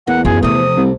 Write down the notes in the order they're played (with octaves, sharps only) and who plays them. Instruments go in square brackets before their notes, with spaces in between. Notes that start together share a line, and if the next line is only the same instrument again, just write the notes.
[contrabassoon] E2 [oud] A#3 [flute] F#5
[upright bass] F#2 [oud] F4 [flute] G#4
[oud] C3 A3 [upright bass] F3 [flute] D#6
[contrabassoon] C2